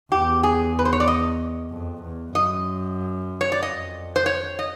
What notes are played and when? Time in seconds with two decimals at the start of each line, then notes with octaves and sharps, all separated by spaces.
0.12 E2 G4
0.43 G#4
0.79 B4
0.85 C5
0.93 C#5
1.00 D5
1.08 D#5
1.70 F2
2.03 E2
2.34 F#2 D#5
3.41 C#5
3.52 D5
3.62 F2 D#5
4.16 C5
4.26 C#5
4.59 D#5